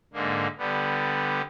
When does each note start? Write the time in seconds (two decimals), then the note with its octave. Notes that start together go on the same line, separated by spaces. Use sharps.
0.13 G#2 D3 A#3
0.58 D3 G3 B3